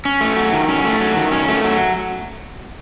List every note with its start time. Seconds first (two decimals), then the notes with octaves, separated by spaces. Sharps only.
0.05 C#4
0.21 A3
0.36 F#3
0.53 D#3
0.69 C#4
0.84 A3
1.00 F#3
1.16 D#3
1.32 C#4
1.48 A3
1.64 F#3